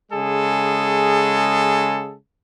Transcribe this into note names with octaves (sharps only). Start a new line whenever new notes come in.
C#3 G#3 G#4 A4